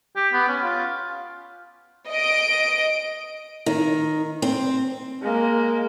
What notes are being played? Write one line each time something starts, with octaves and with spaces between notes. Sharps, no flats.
G4
B3
C#4
F4
D#5 D7
D#3
C4
G#3 A#3